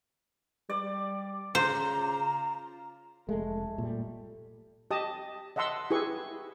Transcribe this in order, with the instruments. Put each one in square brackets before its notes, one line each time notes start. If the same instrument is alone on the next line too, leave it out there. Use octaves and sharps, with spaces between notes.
[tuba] G3 [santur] D5
[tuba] C#3 [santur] F4 [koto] C5 [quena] A#5
[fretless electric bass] F1 G#3 [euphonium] A3
[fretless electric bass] A#2 G3
[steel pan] G4 D#5 A5 D#6
D#5 E5 F#5 A5 C6 E6
E4 G4 G#4 B4 C#6